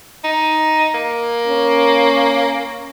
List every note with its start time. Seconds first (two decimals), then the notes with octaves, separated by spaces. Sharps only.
0.24 D#4
0.95 A#3
1.48 C#4